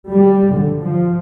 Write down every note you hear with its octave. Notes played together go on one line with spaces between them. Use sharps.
G3
D3
F3